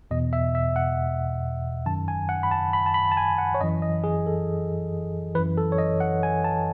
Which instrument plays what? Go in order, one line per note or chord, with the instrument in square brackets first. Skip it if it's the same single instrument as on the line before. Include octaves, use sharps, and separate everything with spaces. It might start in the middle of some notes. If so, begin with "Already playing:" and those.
[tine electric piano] E2 B2 D#5
E5
E5
F#5
F#2 D#3 A5
G#5
F#5
B5
A5
B5
A5
B5
A5
G#5
F#5
C#5
F#2 E3 D#5
D#5
G#4
A4
E3 B4
F#2
A4
C#5
D#5
F#5
G#5
A5